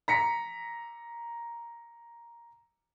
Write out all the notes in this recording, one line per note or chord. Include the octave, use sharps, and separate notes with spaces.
A#5 B6 C#7